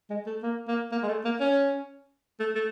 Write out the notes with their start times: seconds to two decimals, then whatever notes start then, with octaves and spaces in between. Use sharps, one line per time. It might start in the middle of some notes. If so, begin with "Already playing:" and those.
0.10 G#3
0.26 A3
0.43 A#3
0.68 A#3
0.92 A#3
1.02 G#3
1.08 A3
1.24 A#3
1.40 C#4
2.39 A3
2.55 A3